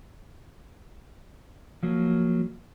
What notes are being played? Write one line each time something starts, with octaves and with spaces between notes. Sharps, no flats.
F3 F#3 A#3